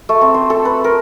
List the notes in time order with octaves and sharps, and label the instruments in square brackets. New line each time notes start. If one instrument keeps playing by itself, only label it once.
[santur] A3
C4
C5
A4
B4
A#4